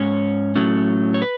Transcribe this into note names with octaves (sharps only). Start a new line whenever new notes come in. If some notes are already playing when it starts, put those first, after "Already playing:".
Already playing: G#2 G#3 C#4 C#5
A2 F#3 A3 C#4
C#5
B4